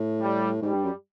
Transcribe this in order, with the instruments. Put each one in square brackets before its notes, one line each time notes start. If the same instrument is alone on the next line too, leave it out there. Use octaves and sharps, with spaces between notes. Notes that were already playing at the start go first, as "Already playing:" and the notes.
Already playing: [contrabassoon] A2
[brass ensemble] G3
[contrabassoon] G#2 [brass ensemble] G3
[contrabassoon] G2
F#2